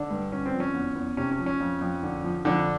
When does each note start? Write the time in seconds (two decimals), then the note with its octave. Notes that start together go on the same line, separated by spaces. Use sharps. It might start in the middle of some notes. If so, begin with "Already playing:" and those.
Already playing: D3 D4
0.10 G2
0.32 D3 C#4
0.46 C4
0.54 F3
0.60 C#4
0.75 E2
0.96 E2
1.17 C3 C#4
1.31 C#4
1.39 F3
1.46 C#4
1.60 F2
1.81 F2
2.03 D3
2.24 F3
2.45 F2 D3 D4